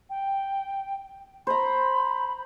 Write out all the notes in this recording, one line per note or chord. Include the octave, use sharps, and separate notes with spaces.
G5
C5 A#5 B5